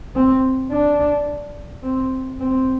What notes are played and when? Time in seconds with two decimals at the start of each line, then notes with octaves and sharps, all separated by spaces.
0.15 C4
0.71 D4
1.84 C4
2.40 C4